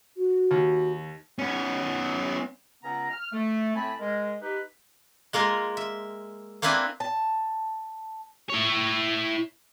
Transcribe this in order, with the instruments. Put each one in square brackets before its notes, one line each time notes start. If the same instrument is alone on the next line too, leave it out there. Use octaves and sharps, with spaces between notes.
[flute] F#4
[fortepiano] D#2
[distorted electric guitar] B3 C#4
[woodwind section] C#2 C#3 B3 C#4 A#5
F6
A3
A2 A3 C4 G#5 A5 B5
G#3 A#4
D#4 G4 B4
[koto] G#3 A#3 F4 A#4
E5
A#3 C4 D4 E4 B4 G#5
[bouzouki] A5
[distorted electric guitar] E4 C#5